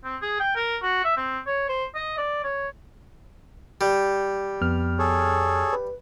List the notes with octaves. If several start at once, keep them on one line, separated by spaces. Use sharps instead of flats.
C4
G#4
G5
A#4
F#4
E5
C4
C#5
C5
D#5
D5
C#5
G3
F2 B3 F6
G#4 A4 C#5
B4